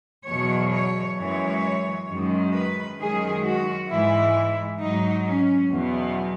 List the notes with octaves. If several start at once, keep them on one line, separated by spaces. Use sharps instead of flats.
E2 B2 F#3 C#5
C#5
F#2 E3 G#3 C#5
F#2 D#3 G#3
B4
F#2 D#3 G#3 G#4
F#4
G#2 E3 G#3 E4
G#2 F#3 D#4
C#4
E2 B2 F#3 B3